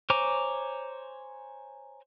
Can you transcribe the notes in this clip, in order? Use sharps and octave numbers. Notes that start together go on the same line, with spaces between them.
C5 C#5 G#5 A#5 D6